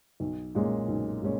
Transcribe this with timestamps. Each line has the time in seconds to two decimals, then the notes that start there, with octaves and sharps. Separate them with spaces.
0.20 B1
0.55 A#2 G#3 C#4
0.88 B1
1.22 A#2 G#3 C#4